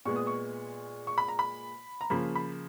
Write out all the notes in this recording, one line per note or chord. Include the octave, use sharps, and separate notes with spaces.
A#2 G#3 B3 C#6
D#6
C#6
C#6
B5
A#5
B5
A#5
C#3 F3 A#3 B5
B5